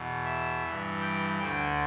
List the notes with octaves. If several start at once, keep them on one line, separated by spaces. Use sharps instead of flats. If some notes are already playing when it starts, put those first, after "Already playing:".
Already playing: E2 B2
E5
E3
G2
G5
D2 D3 G5